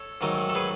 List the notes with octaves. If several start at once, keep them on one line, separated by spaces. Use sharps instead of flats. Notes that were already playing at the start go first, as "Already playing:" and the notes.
Already playing: A4 C#5
G#2 D#3 F#3 A3
A4
G#4 B4